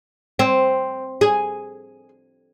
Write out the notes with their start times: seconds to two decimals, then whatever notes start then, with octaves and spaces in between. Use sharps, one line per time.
0.39 C4
1.21 G#4